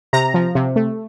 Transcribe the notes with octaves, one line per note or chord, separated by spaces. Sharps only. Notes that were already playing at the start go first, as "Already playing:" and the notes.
C3 A#5
F3
C3
A3